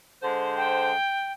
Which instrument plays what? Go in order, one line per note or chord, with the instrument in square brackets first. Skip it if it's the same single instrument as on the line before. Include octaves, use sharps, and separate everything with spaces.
[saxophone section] D3 G#3 C5
[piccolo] G5